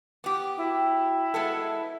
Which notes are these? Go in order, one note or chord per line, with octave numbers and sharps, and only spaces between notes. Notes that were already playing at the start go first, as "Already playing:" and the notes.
B3 G4
E4 F#4 G5
G#3 B3 A4 E5